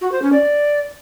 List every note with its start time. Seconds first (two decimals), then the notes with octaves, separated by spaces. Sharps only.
0.01 F#4
0.12 C5
0.22 C#4
0.33 D5